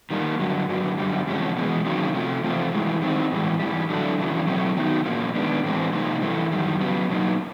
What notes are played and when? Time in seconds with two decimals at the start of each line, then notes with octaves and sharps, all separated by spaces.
0.11 D#3 G3 A#3
0.40 G2 D3 F#3
0.69 G2 D3 F#3
0.97 F#2 D3 G3
1.27 E2 C3 F3 G#3 C#4
1.56 E2 B2 G#3
1.85 C3 D#3 F#3 A#3 C#4
2.14 C3 F3 A3
2.44 E2 C3 F3 A3 C4
2.73 G2 E3 G#3
3.02 D#3 G3 C4 D#4
3.31 A2 E3 G#3
3.60 G#2 E3 G3
3.89 D3 F#3 A3 D4
4.18 F2 C#3 E3
4.47 B2 F#3 A3 C4
4.77 D#3 F#3 B3 D#4
5.06 A#2 F3 A#3 C#4
5.35 D#3 G#3 B3 D4
5.64 A2 E3 G#3 C4
5.93 C3 F3 A#3 D#4
6.21 G2 E3 A3
6.52 F#2 D#3 G3
6.81 C#3 F#3 B3
7.09 B2 F#3 A#3 D#4